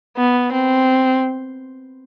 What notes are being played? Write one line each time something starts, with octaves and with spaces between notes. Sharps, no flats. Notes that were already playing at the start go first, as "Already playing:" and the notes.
B3
C4